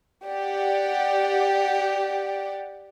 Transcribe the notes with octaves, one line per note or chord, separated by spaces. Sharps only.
G4 D5 F#5